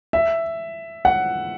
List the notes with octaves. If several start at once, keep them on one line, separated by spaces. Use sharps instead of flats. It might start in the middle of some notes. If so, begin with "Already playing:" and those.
E5
F#5